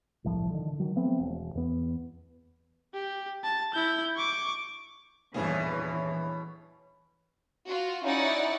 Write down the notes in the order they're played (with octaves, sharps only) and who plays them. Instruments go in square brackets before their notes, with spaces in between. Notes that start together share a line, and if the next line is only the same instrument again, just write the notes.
[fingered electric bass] G1 C2 A2 F3
D3 D#3
D#3 F#3
F3 A3 B3 C4
E1
E2 B3
[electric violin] G4
A5
E4 G6
C#6 D6
[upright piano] D#1 G2 [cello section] E2 E3 [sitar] B2 E4 G#4 [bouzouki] C#4
[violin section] F4 F#4
C#4 D#4 E4 D5 F#5